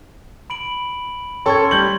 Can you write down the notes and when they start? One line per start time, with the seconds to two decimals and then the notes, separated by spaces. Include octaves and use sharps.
0.50 B5 D7 F#7
1.46 C#4 A4 C6 C#6 G#6
1.71 G3 G6 F#7